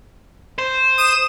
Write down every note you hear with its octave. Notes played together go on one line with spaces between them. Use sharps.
C5
D#6 E7